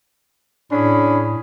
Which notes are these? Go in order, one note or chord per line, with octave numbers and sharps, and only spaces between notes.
A2 C#4 D4 G#4 B5